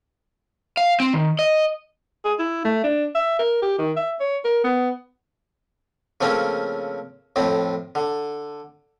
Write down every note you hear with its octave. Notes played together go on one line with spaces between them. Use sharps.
F5
C4
D#3
D#5
G#4
E4
A3
D4
E5
A#4
G4
D#3
E5
C#5
A#4
B3
C#3 F3 A3 A#3 C4 C#4
F2 A2 C4
D3